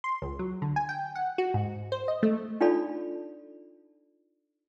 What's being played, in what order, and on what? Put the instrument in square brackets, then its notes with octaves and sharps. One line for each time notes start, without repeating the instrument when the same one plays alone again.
[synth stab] C6
C#2
F#3
D3
G#5
G5
F#5
F#4
G#2
C5
D#5
A3
[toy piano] D4 D#4 F4 A4 D5 B5